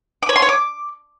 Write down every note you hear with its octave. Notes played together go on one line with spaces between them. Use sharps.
D6
C#5
C6
C#5
D6